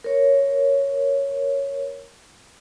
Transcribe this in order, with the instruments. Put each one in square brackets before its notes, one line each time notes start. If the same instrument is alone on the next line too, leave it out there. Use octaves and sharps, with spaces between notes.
[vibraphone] A#4 C#5